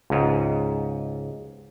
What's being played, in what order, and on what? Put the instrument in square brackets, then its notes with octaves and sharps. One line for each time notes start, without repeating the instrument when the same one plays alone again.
[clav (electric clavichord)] C#2 G#2